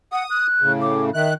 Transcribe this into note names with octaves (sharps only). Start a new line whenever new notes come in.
F#5 D#6
F#6
A2 C#3
D6
D#3 E5 F#6